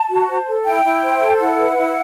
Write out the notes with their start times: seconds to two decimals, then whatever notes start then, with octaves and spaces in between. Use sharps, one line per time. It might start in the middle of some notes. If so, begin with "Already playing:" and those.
Already playing: A5
0.10 F#4
0.28 C5
0.47 A4
0.65 E4 G5
0.84 E4
1.03 C5
1.21 A4
1.40 E4 F#5
1.59 B4
1.77 E4